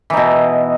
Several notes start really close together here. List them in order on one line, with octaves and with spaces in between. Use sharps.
E3 D#4 B2